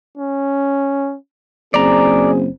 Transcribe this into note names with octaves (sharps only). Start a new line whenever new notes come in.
C#4
F#1 C4 G#4 D5 A#5